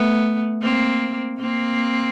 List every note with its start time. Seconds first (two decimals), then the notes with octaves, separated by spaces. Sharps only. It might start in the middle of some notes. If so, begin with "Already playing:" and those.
Already playing: A3 B3
0.62 A#3 C4
1.40 A#3 C4